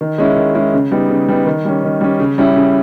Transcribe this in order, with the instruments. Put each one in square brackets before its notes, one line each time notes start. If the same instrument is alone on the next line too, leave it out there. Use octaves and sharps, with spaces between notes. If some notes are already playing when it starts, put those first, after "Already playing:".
[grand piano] D#3
G#3 C#4 E4
D#3
G#3 C#4 E4
C#3
G3 B3 D#4
C#3
G3 B3 D#4
D#3
G3 C#4
D#3
G3 C#4
C#3
G3 C#4 E4
C#3